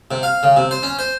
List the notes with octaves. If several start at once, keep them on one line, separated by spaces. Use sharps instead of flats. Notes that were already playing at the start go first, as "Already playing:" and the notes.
C3
F5
C#3
C3
C5
C#4
C5